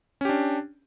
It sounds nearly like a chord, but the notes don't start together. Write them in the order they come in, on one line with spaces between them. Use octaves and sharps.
C#4 G4 D4